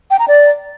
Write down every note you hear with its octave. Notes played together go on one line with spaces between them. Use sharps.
G5
A#5
D5